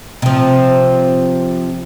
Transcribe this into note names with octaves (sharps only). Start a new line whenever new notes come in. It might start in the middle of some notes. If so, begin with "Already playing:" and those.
C3 F3